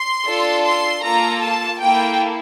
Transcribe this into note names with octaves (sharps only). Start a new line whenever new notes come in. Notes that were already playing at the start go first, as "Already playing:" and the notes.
Already playing: C6
D4 F4 A4
C6
A#3 F4 A4 A#5
A5
A#3 E4 A4 G5